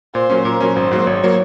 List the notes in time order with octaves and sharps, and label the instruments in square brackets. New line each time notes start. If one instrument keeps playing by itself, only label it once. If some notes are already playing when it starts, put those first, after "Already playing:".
[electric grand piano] A#2 [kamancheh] C5
[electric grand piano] F#3 A#3 C#4
[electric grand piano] A#2 [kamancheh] A#4
[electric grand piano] F#3 A#3 C#4
[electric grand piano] G#1 [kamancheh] C5
[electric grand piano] G#2 F#3 A#3
[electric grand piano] G#1 [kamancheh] C#5
[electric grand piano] F#3 A#3